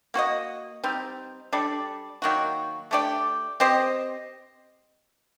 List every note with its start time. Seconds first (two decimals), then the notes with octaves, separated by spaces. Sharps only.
0.14 A#3 F#4 C5 D#5
0.84 G3 C4 D#4
1.53 G3 D4 A4 D5
2.22 D#3 F#3 A#3 F#4
2.91 A3 D4 G4 D5
3.60 C4 G4 C5 D#5